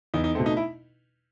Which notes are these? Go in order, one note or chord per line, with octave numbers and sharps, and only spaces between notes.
E2 D#4
D#4
B2 A3 C4
D#4
E4